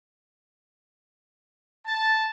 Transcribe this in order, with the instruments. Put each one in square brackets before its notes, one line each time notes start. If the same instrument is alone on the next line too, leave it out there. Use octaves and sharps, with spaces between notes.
[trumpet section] A5